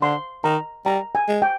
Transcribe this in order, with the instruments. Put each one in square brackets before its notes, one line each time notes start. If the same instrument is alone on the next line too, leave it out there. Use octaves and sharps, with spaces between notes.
[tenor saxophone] D3 [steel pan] C6
[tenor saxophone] D#3 [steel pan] A#5
[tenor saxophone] G3 [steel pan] A#5
[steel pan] G#5
[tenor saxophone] G#3
[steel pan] G5